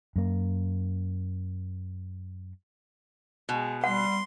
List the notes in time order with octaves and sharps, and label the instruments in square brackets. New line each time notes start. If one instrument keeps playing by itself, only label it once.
[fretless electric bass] F#2 A#3
[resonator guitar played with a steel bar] B2 [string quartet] G#3
[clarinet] G3 [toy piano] F#5 [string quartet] C6